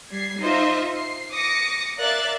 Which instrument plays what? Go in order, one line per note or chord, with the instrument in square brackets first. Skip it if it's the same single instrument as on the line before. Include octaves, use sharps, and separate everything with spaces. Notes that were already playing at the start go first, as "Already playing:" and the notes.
[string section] G3 G#6 C7
D#4 F4 C5 D#5 E5
C7
D6 D#6 A#6 C#7
A#4 D5 E5 F5 F#6 A6